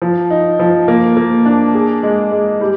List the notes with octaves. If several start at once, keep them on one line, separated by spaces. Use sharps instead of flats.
F3
D#4
F3
A#3
A#3
D4
G#4
G#3
G#3
G3